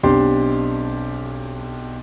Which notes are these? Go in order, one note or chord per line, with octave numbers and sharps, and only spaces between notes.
B1 C4 D4 G4 C6